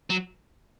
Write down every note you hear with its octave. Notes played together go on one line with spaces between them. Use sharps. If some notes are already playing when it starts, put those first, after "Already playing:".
F#3